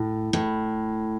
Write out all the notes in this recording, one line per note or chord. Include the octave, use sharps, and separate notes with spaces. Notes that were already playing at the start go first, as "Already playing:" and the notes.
Already playing: A2
A2